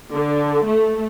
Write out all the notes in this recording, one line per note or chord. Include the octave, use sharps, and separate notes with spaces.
D3
A3